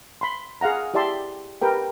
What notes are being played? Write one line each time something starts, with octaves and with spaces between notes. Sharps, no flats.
B5 C6
G#4 F5 F#5 A#5
E4 G4 D5 E5 A5 C6
G4 A#4 B4 G5